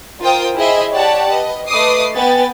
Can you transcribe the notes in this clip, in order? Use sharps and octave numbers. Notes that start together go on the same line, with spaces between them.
F4 A#4 C5 G5 D#6
E4 G#4 C5 D#5 E5
G4 C#5 D5 F#5 A5
B4 D#5
A3 B4 D#5 D6 D#6 C7
B3 G5 G#5 A6